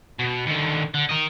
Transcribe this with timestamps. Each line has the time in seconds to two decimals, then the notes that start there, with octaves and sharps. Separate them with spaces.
0.19 B2
0.46 D#2 D3
0.94 D3
1.09 A#4 D#5